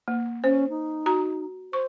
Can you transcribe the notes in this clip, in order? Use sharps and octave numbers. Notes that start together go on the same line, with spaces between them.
A#3
C#4 C5
D#4
F#4 A#5
C5 C#6